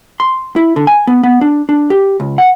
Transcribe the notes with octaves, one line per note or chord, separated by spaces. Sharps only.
C6
E4
D3
G#5
B3
B3
D4
D4
G4
C#2
F#5